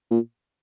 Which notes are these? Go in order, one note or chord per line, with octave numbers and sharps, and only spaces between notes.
A#2